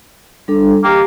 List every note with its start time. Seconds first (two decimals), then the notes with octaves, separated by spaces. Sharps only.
0.48 G3 D4 A4
0.84 A#3 G4 G5